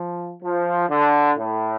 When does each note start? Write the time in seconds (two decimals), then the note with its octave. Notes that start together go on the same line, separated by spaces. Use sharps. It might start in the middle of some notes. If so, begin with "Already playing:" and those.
Already playing: F3
0.42 F3
0.88 D3
1.36 A2